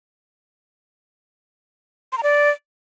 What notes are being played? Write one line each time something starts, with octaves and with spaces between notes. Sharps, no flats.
C6
A#5
D5